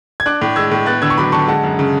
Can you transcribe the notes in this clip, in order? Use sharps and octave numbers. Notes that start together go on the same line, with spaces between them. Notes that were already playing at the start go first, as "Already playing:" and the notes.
G#6
D4 D6 F#6
A2
G#3 E6 G#6
A2
B3 F#6 A6
D3 E6 G#6
C#6
F#3 B5 D6
D3 A5 C#6
G#3 F#5 A5
F#2
C#3